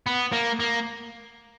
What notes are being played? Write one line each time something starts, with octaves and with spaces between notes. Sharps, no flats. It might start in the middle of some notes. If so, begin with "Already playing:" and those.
B3
A#3
A#3